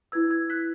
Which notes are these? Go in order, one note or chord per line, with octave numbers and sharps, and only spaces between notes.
E4 B4 E6 G#6
E6 G#6
F#6 B6